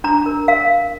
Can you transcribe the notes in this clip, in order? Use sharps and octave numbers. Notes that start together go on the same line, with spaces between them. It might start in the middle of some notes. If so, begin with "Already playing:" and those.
D4 A#5
A#4
A#4 F5